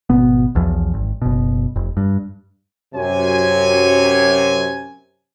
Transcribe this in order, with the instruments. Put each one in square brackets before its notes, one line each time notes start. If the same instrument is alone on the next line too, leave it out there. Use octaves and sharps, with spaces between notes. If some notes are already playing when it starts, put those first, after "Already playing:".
[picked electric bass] G#1 B2 B3
B1 E2 F3
G#1
F#1 B2
F1
G2
[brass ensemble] F#2 C3 C#5 G#5